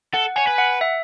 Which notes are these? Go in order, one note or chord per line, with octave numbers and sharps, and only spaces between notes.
A4 F#5
C#5 G#5
B4
F#5
E5